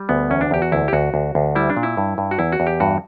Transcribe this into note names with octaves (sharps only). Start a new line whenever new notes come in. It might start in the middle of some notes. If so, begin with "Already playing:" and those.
Already playing: G3
D2 B3
E2 C#4
D4
E2 G4
F#4
D2 E4
G4
D2 F#4
D2
D2
G3 E4
D4
A#2
E4
G2
G2
F#4
E2 E4
F#4
E2
G4
G2 F#4